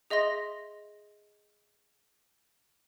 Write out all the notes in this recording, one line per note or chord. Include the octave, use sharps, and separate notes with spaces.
G#4 D#5 E5 C6 A#6